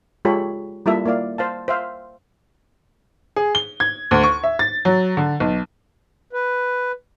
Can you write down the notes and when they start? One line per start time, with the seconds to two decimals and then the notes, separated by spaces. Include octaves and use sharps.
0.25 G#3 F4 G4 A4 C#5 B5
0.86 G3 A#3 E4 F4 A4 E5
1.06 A#3 E4 D5 F5
1.38 C5 F5 A5
1.68 C5 E5 F5
3.36 G#4
3.55 G7
3.80 G#6
4.11 D2
4.23 C#6
4.44 E5
4.59 A6
4.85 F#3
5.17 D3
5.40 B1
6.33 B4